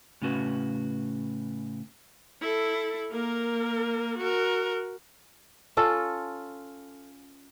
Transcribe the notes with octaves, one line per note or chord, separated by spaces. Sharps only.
A2 C#3 C#4 F#4 B4
E4 A4
A#3 A#4
F#4 A#4
C#4 F4 A4